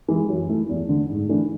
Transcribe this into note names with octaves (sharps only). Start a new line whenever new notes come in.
E3 G#3
F#2
E3 A3 E4
E2
D3 A3
G#2
E3 A3 D4